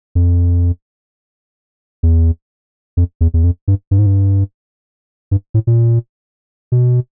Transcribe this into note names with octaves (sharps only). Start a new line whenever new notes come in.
F2
E2
F2
E2
E2
F2
G2
G2
G#2
G2
G2
A2
A#2
B2